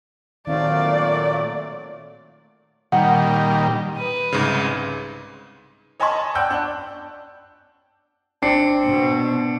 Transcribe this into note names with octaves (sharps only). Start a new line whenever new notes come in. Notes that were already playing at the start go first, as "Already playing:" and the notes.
A#2 D#3 F#3 A3 C4 A4 D5 F5
A#2 D#3 G3 F#5
B4 D#6
C2 G#2 C#3
C#5 D#5 G#5 A5 B5 C#6
D5 F#5 G5 E6 F#6 G6
D4
C4 D4 C7 C#7
B2